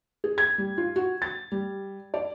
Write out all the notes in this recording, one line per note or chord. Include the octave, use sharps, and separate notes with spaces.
G#4
G#6
G3
F4
F#4
A6
G3
D5